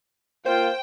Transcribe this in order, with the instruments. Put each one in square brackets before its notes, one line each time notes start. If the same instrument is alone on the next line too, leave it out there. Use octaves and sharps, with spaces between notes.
[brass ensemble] A#3 F4 [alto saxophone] C5 [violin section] G5